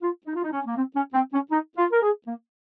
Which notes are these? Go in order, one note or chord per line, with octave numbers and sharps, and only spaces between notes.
F4
D#4
F4
D#4
C#4
A#3
C4
C#4
C4
C#4
D#4
F4
A#4
G#4
A#3